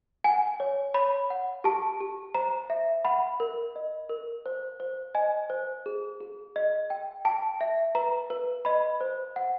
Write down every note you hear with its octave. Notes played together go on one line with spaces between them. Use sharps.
F#5 G#5
C#5
C#5 B5
F#5
G4 A5
G4
C5 A#5
E5
F#5 B5
A#4
D#5
A#4
C5
C5
D#5 G#5
C5
G#4
G#4
D#5
G5
G5 A5
E5
B4 A#5
B4
D#5 B5
C5
F#5